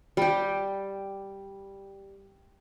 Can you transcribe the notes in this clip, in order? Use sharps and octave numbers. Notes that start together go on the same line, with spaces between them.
G3 G4